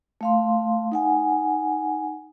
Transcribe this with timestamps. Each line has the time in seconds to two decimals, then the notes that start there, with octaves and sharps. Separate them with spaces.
0.21 A3 F5 C6
0.92 D#4 F#5 G#5